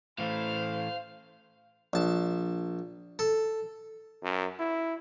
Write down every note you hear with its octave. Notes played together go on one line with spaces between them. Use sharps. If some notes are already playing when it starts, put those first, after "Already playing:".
A2 E3 A3 C5 F5
A#1 A5
A4
F#2
E4